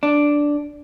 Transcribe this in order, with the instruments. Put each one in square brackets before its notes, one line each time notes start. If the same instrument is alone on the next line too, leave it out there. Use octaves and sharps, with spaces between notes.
[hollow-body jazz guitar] D4